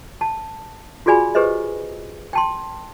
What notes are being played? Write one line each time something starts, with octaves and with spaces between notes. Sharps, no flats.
A5
F4 F#4 G#4 D5 G#5 B5
G4 G#4 B4 C5 D#5
G5 A5 C6